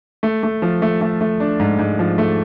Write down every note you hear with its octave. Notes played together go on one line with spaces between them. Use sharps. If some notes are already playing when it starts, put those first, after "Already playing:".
A3
A3
F3
A3
A3
A3
D4
G#2
G#2
F3
A3